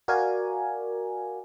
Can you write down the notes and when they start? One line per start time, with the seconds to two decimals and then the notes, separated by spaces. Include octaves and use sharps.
0.08 F#4 A#4 D5 F5 G#5